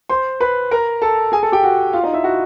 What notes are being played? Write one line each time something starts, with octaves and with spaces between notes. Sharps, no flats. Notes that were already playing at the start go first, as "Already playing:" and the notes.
C5 C6
B4 B5
A#4 A#5
A4 A5
G#4 G#5
A4 A5
G4 G5
F#4 F#5
F4 F5
D#4 D#5
E4 E5
F#4 F#5